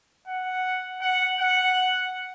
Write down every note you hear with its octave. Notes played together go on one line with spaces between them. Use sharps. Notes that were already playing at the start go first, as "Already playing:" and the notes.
F#5
F#5
F#5